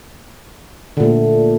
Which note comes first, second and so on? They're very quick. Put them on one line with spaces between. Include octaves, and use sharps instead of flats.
D3 A#2 A3